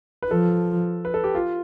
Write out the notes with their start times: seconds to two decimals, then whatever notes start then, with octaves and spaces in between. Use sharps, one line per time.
0.22 B4
0.30 F3 A4
1.05 B4
1.14 A4
1.24 G4
1.35 F4